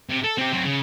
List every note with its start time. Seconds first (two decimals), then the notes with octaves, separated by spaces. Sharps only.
0.09 C3
0.24 A4
0.38 C4 G4
0.53 F#3 C4
0.65 C#3